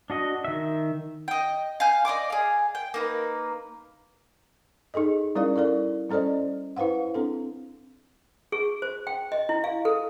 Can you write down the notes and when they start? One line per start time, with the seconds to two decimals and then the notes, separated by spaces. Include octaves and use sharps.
0.10 D4 F#4 D#5
0.45 D#3 E5
1.28 D#5 G5
1.80 F5 G#5 G6
2.05 D5 D#5 G5 D6
2.30 G#4 F5
2.75 G5
2.94 A#3 D#4 B4
4.94 D#4 G#4 A4 D#5
5.36 G3 C#4 E4 A#4 D5 F5
5.56 E4 A4 A#4 D5
6.10 G3 C#4 A4 C5 D5 D#5
6.77 E4 B4 C5 F5 F#5
7.15 C4 D4 A4
8.52 G#4
8.82 C5
9.07 G5
9.32 D#5
9.49 E4
9.64 F5
9.85 A4